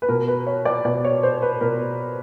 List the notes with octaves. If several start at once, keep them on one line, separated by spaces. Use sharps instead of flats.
B4
B2 A#4
B4
C#5
D5
B2 D5
C#5
C5
B4
B2 A#4